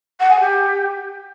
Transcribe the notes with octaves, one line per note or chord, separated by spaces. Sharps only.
F#5
G#5
G4